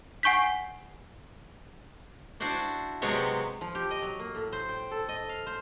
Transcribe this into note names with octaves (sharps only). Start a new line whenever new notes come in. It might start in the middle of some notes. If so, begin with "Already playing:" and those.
F#5 G#5 C#6 G6 B6
D4 E4 F#4 C5 D5
C3 F#3 G#3 B3 C#5 G5
F3
G4
D#5
F#3
A#3
A2
C5
G5
A4
D#5
F5
C5